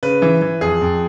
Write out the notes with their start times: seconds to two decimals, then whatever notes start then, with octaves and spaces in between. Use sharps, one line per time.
0.03 C#3 B4
0.22 E3
0.42 E3
0.61 F2 G#4
0.81 F2